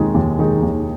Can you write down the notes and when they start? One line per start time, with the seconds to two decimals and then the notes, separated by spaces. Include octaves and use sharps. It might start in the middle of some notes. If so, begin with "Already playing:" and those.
Already playing: D#2 D#3 G#3 D#4 G#4
0.14 D#2
0.39 D#3 G#3 D#4 G#4
0.62 D#2